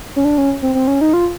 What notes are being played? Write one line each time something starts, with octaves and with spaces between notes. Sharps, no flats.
C#4
D4
C#4
C4
C4
C#4
D#4
F4